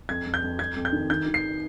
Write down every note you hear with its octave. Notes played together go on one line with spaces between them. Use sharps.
F2 G#6
F2
G6
F2
F2 G#6
F2
G6
D#3
D#3 G6
D#3
C7